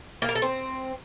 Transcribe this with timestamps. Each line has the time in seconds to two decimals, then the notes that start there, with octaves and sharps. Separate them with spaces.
0.22 A#3
0.29 A#4
0.35 A4
0.42 C4